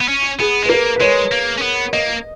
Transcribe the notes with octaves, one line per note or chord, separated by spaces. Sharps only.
B3
C#4
B3 G#4
G#3
B4
A#3 A#4
B4
G#3 C#5
A#3
C#4
B3
A#3 D#5